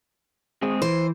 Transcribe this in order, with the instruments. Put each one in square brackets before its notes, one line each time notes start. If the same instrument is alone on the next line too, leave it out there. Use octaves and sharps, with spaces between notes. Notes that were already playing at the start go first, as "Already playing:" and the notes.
[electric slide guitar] G#3 C4 G#4
[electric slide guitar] E3 [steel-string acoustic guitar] C5